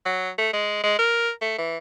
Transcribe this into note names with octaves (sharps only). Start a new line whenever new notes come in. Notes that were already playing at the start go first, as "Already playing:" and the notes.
F#3
A3
G#3
G#3
A#4
A3
E3